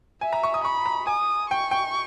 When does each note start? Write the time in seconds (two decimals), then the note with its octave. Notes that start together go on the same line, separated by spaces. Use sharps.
0.21 E5 G#5
0.33 A#5
0.43 C#6
0.54 D#6
0.64 B5 C#6
0.86 A#5
1.07 G#5 D#6
1.50 G5 C#6
1.71 G5